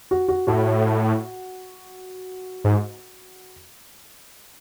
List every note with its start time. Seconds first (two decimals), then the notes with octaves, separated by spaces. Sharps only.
0.11 F#4
0.28 F#4
0.47 A2 F#4
2.64 G#2